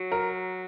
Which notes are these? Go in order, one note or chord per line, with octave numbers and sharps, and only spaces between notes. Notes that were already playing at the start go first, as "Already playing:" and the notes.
Already playing: F#3
A#4